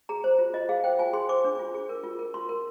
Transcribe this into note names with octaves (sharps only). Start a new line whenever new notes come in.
G#4 A#5
C5
F4
F4 D#5
G#4 F5
C5 G5
F4 G#5
G#4 C6
C5 D6
D4
F4
G#4
A#4
F4
A#4
F4 C6
A#4